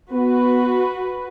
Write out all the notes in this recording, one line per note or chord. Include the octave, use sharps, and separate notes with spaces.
B3 F#4 B4